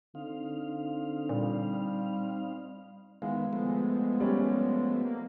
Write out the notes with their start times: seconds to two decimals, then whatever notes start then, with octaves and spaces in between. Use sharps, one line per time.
0.15 D3 C4 D#4 F5
1.29 A#2 G3
3.22 D#3 G#3 B3 E4 F5
3.53 F3 A3 B3
4.20 G3 C#4
5.05 A#3